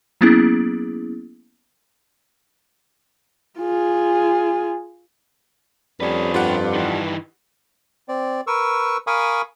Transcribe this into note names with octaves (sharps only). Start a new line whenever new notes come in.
F#3 A#3 B3 C#4 E4 G#4
F4 G#4
F2 G3 C#4 D4 G#4 B4
G2 F4 G4 F#5
D#3 E3
C4 D5
A#4 B4 C#6 E6
A#4 F5 G#5 B5 C#6 D#6